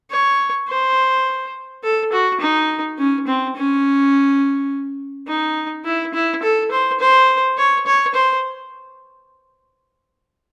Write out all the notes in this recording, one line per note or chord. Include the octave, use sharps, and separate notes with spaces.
C#5
C5
A4
F#4
D#4
C#4
C4
C#4
D#4
E4
E4
A4
C5
C5
C#5
C#5
C5